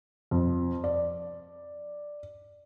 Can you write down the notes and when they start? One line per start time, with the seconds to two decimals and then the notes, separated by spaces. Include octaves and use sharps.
0.31 F2
0.84 D5